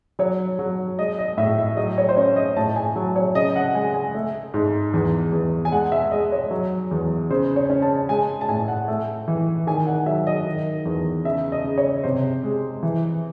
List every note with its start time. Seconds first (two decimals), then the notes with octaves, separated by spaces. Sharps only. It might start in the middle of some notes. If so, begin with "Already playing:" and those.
0.19 F#3 C#5
0.59 F#3
0.99 G#3 D#5
1.19 D#5
1.37 A2 E5
1.58 E5
1.77 F#3 D#5
1.98 C#5
2.09 C5
2.17 C#4 C#5
2.36 D#5
2.56 A2 A5
2.76 G#5
2.96 F#3
3.16 C#5
3.35 C#3 D#5
3.56 F#5
3.75 G#3 G#5
3.94 G#5
4.15 A3
4.54 G#2
4.94 E2
5.32 E2
5.65 G#5
5.72 G#3 F#5
5.92 E5
6.11 G#3 D#5
6.32 C#5
6.51 F#3
6.91 E2
7.30 C#3 C5
7.56 C#5
7.70 C#4
7.82 A5
8.09 G#3 G#5
8.41 A5
8.48 A2 G#5
8.68 F#5
8.88 A3
9.28 E3
9.67 D#3 G#5
9.87 F#5
10.06 F#3 E5
10.27 D#5
10.47 D#3
10.85 E2
11.25 C#3 E5
11.52 D#5
11.64 C#3
11.78 C#5
12.04 C3 C5
12.44 G#3
12.83 E3